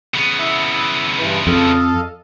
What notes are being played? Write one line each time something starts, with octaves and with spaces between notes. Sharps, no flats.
C#3 B3
E4 E5
G2 E3 B4
F2 A4 D#5 F5